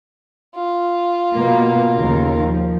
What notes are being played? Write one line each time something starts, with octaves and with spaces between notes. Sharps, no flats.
F4
B2 A#3
D#2 C#3 A#4
F3